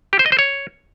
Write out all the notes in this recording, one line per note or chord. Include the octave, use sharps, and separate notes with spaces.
G4
C5
D#5
C5
C#5